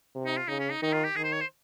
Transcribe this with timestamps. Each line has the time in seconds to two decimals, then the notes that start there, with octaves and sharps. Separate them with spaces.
0.15 C3
0.26 D#4
0.37 F4
0.48 C#3 D#4
0.60 C#4
0.71 D#4
0.82 D#3 D#4
0.93 F4
1.04 G4
1.16 D#3 G#4
1.24 C5
1.32 C#5
1.41 C5